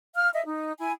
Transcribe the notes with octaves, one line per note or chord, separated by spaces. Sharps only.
F5 F6
D#5 E5
D#4
E4 G#5